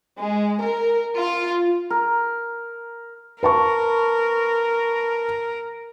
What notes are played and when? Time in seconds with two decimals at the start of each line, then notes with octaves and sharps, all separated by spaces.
0.20 G#3
0.62 A#4
1.17 F4
1.90 A#4
3.43 A#4 B4 A5 C#6